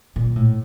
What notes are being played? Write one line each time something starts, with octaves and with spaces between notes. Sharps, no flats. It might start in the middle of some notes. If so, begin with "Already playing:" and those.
A#2
A2